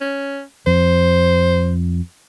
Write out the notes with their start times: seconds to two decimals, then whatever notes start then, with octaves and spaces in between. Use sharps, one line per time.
0.01 C#4
0.67 F2 C5